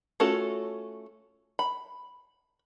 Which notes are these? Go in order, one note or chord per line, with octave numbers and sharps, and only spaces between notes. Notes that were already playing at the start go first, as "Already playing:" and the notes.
A3 C#4 F4 F#4 A4
B5